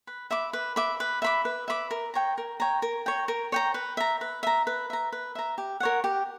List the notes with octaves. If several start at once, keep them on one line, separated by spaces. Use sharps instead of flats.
B4
E5 B5 D6
B4
E5 B5 D6
B4
E5 B5 D6
B4
E5 B5 D6
A#4
C#5 G5 A#5
A#4
C#5 G5 A#5
A#4
C#5 G5 A#5
A#4
C#5 G5 A#5
B4
E5 A#5
B4
E5 A#5
B4
E5 A#5
B4
E5 A#5
G4
A#4 C#5 F#5
G4